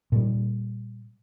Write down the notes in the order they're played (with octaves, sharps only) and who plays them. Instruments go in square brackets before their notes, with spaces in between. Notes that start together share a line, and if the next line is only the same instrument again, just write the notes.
[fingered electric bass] A#2 G3